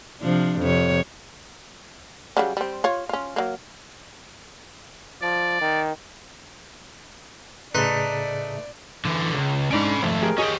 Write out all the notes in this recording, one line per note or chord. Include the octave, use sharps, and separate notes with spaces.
C3 F3 D4
F2 C3 C#5
C#3 F#3 G3
G3 C4
F4 C#5
C#4 F4
F#3 A#3
F3 D5
D#3
A2 C#3 A3 D#4 G#4 B4 D5 C6
D3 E3
C#2
G#2 C#4 D4 B5 D7
G#1 F3 A3
G4 G#4 A#4
C#4 G4 G#4 D#5